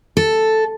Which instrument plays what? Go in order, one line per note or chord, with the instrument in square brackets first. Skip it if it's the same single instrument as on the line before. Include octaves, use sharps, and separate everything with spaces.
[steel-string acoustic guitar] A4